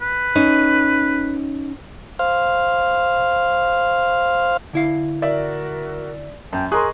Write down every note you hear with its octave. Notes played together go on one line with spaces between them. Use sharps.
B4
C#4 D#4
C5 F5
D3 E4 F5
F#4 A#4 D5 E5
F#2 G5 A5 G6
G#4 A#4 D#5 C6 C#6 D#6 F#6